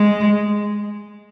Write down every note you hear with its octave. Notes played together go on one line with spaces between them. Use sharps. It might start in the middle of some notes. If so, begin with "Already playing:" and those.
Already playing: G#3